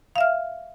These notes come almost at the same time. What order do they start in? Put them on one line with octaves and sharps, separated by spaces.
F5 E5 F6